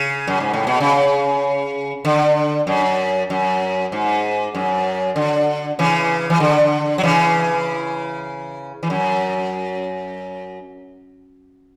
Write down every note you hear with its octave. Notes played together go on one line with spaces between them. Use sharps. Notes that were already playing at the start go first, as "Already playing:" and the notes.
Already playing: C#3
F#2
G#2
A2
B2
C#3
D3
F#2
F#2
G#2
F#2
D3
C#3 E3
E3
D3
F#3
C#3 E3
E3
F#2